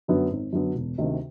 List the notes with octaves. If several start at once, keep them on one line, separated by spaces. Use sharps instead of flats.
F#2 D3 F#3 B3
G#1
F#2 D3 F#3 B3
E1
D2 C3 D#3